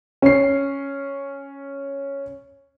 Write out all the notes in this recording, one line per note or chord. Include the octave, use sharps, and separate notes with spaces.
C#4 C7